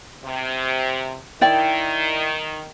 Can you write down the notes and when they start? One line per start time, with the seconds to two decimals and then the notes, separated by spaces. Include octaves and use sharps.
0.24 C3
1.41 D#3 E4 D5 G5